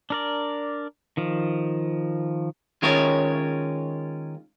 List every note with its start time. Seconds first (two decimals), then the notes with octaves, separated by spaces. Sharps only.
0.10 D4 A#4 D5
1.17 D#3 F3
2.82 D#3 G#3 C#4 F4 A#4 C#5